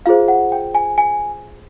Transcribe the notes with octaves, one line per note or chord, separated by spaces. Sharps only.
F4 G#4 C5 F5
F#5
G5
G#5
G#5